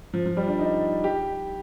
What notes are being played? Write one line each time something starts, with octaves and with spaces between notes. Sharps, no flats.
F3
F3
G3
D4
D#4
G4